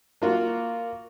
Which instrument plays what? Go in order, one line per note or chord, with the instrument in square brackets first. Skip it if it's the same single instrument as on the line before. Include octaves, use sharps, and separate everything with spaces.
[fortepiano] A#3 F4 F#4